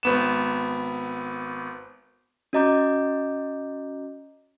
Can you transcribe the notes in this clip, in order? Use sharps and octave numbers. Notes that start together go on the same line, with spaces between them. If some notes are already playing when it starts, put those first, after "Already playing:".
G#1 B3 E7
C#4 F#4 D#5 A#5 D6 G6